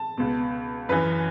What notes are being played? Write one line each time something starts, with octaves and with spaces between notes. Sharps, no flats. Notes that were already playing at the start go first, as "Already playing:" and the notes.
Already playing: A5
C#2 B2
F#2 E3 B4